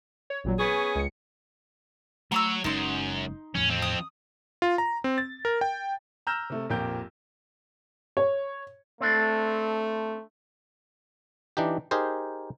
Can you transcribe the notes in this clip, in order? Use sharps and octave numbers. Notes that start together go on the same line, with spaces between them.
C#5
A1 A#2 F#3
B3 C#4 G#4 C#6 B6
C#2 C#7
F#3 A3 C#5 A#5 D6 E6
F#1 F#2 G#3 C#4 D#4 C6
E2 A2 F3 C#4
F2 C4
D#6
F4
A#5
C4
A6
A#4
G5
A#5 E6 F6 G6 A#6 E7
C3 A3
A#1 F2 G4 A#4 G6
C#5
A3 C4 D4
E3 D4 D#4 G4
D#4 G4 G#4 A#4 C5